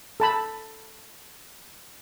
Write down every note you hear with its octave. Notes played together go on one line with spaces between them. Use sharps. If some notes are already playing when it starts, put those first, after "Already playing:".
A4 A5 B5